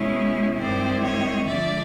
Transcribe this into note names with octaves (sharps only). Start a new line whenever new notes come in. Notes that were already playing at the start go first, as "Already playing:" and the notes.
Already playing: B2 G#3 C#4 E4
G2 D#3 G#3 C4 E4 C5 D5
C#5 D#5
D3 F3 G#3 D5 E5